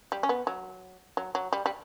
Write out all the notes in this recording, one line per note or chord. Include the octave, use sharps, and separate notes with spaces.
G3
C#4
B3
F#3
F#3
F#3
G3
G3